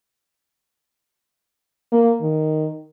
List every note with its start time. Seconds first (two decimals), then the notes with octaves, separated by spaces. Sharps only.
1.92 A#3
2.22 D#3